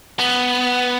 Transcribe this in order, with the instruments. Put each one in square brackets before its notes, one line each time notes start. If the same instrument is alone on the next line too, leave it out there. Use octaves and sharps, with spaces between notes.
[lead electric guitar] B3